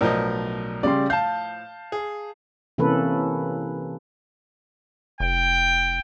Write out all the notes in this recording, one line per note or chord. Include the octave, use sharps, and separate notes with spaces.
B1 A2 F3 A#4 D5 D#5
C#3 G3 D5 C6
F5 A5 G6
G#4
C3 E3 A#3 C#4 A4 B4
F1 G5